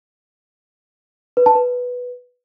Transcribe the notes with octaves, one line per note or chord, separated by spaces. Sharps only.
B4
A5
B4